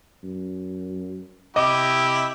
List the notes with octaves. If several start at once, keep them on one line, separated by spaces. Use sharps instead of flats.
F#2
C3 E4 G4 D#5 D6